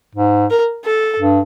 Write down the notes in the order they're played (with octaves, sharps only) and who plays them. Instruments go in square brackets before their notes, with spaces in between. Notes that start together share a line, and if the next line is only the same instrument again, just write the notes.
[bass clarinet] G#2
[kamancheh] A#4
A4
[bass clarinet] G2